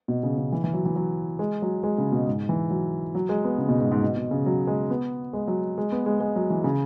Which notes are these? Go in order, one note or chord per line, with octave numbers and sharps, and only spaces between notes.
B2
C#3
C#3
E3
E3
F#3
E3
F#3
G#3
F#3
G#3
C#3
B2
G#2
E3
F#3
F#3
G#3
B3
C#3
B2
G#2
G#2
B2
B2
C#3
F#3
G#3
B3
G#3
F#3
G#3
B3
G#3
G#3
F#3
E3
C#3